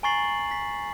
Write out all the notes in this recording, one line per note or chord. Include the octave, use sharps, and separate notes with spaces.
G#5 A#5 C#6 A6 C7 F#7
B6